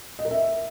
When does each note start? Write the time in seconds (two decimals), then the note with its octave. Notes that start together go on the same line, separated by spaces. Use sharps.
0.19 D#5
0.25 A#4
0.31 E5